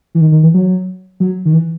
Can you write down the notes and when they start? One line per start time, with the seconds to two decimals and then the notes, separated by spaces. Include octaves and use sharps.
0.15 E3
0.21 D#3
0.32 D#3
0.43 E3
0.54 F#3
1.20 F#3
1.45 D#3
1.53 E3